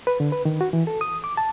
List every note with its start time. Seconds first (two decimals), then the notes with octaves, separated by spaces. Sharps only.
0.07 B4
0.20 D3
0.32 B4
0.45 D#3
0.61 F#4
0.73 E3
0.87 A4
1.01 D#6
1.24 D6
1.37 A5